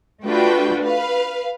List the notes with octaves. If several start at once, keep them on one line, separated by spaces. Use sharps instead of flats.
A3 D4 F4 F#4 B4 G5
B4 F5